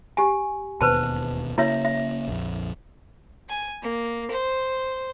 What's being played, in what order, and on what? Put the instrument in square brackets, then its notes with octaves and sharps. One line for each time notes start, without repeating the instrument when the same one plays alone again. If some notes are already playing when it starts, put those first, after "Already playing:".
[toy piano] G4 G#5
[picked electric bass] E1 D#2 B2 [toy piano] B4 C5 A5
[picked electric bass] C#3 A#3 [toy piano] E4 C#5 E5
[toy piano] E5
[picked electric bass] A#1 F2
[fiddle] G#5
A#3
C5